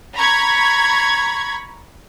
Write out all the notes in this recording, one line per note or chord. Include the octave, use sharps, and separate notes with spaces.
A#5 B5 C#6 G#6